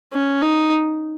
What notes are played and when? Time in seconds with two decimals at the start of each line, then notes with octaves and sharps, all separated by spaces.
0.13 C#4
0.42 D#4